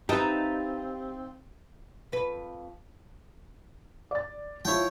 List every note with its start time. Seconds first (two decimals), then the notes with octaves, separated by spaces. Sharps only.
0.09 C4 D#4 G4 B4 E5 F5 A5
2.12 F2 B4
4.11 D5 A6
4.65 F3 E4 C#5 G5